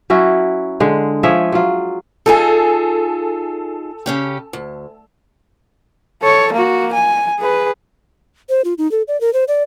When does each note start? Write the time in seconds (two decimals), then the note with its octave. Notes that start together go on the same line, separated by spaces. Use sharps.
0.10 F#3 C#4 E4 F#4
0.80 D3 G#3
1.23 F3 G#4 C#5 E5
1.52 F#3 F4
2.26 D#4 F4 G#4 A4 G#5
4.06 C#3 C#4 G4
4.53 D2
6.22 A4 C#5
6.53 A#3 F#4
6.93 G#5
7.40 G#4 B4
8.49 C5
8.65 F4
8.78 D#4
8.91 A4
9.08 D5
9.21 A#4
9.33 C5
9.48 D5